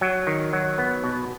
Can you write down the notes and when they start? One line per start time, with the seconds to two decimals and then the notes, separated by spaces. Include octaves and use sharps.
0.01 F#3
0.27 D#3
0.53 F#3
0.78 B3
1.04 B2